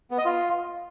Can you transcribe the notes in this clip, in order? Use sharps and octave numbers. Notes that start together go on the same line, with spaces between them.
B3
D#5
F4